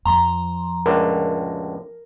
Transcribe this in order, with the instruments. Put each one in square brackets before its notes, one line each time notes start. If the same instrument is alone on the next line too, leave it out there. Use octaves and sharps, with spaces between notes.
[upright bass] F2 F3 [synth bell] A#5 C6
[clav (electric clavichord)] C#2 A2 D3 [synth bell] A#4